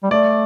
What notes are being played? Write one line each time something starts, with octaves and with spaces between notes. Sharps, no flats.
G3
A3 D5